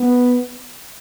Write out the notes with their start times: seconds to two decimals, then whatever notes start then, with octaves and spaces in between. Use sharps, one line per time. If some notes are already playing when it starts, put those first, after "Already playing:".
Already playing: B3